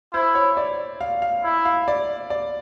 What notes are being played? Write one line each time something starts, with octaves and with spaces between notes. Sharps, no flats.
E4 C5
C#5
D5
F5
F5
E4
F5
D5
D5